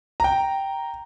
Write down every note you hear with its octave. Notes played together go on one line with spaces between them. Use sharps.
G5 A#5